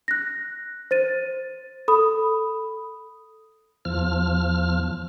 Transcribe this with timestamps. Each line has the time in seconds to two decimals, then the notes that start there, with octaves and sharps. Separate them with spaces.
0.08 F#6 A#6
0.91 C5 A6 D#7
1.88 A4 B5 D#6
3.85 E2 F3 F6